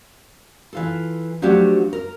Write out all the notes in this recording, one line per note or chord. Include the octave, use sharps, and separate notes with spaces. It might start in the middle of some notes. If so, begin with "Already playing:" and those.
E3 F4 A4
F3 F#3 A3 D4 F#4 G4
A#4